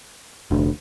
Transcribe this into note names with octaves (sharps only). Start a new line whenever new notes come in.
F1 D2